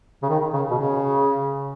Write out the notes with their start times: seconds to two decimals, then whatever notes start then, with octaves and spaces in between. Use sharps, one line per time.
0.23 C#3
0.30 D#3
0.53 C#3
0.70 B2
0.78 C#3